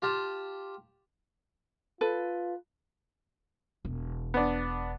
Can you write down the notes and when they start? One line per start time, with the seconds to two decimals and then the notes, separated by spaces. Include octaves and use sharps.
0.02 F4 G4 A5
2.01 F4 A4 B4
3.85 E1
4.34 B3 D4